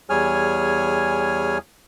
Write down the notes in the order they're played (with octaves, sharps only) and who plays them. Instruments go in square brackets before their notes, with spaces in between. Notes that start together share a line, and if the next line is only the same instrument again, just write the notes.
[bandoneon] E2 G3 G#4 C#5 G#5 F6